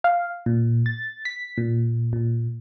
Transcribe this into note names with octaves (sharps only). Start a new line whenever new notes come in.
F5
A#2
A6
B6
A#2
A#2